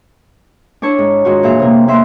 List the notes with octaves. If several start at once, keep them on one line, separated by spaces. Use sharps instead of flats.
D4 E4 C#5
G#2
G#2 D#3 F4 F#4
A#2 E3 G#4 E5 F5
C3 A#3
E2 A#3 E5 C6